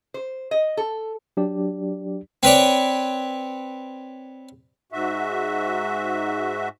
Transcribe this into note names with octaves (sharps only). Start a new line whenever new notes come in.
C5
D#5
A4
F#3 D4 G4 D5
C4 B4 C#5 D5
G#2 F#4 E5